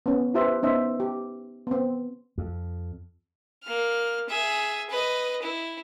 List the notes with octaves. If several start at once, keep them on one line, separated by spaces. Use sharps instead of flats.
B3 C#4
E4 F4 G4 B4 C5 E5
B3 C#4 D#4 C5 D#5 E5
G4
B3 C4
F2
A#3 F6
G#4 E5
B4 D#5
E4